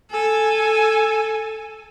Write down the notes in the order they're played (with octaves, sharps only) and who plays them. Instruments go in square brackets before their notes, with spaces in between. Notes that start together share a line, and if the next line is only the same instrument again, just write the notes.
[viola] A4 [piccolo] G#5